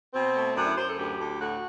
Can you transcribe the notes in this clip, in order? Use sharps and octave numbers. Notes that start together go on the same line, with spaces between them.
B2 C4
A3
F#2 D4
E4
F#2 C5
A4
D2 G4
D2
A2 F#4